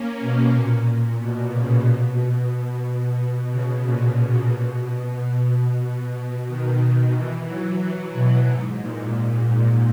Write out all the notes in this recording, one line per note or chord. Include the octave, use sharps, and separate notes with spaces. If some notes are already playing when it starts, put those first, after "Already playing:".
Already playing: A#3 C#4
B2
A#2
B2
C#3
B2
B2
C#3
A#2
B2
B2
B2
B2
B2
D#3
E3
F#3
F#3
B2
G#2
A#2